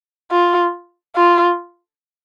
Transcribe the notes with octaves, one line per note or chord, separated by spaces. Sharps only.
F4
F4